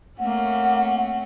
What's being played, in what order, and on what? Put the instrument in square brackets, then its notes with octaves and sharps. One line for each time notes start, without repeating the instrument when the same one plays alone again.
[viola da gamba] A3 C4 C#4 [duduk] A#3 [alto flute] F#5